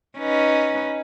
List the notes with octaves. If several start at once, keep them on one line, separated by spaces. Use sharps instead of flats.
C#4 D#4 B4